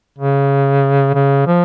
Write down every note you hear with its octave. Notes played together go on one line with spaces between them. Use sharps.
C#3
C#3
F3